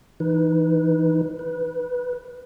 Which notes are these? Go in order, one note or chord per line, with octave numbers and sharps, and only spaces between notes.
E3 D#4 B4
B4